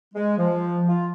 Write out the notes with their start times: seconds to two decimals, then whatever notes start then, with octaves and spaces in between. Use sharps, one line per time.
0.14 G#3
0.38 F3
0.87 F4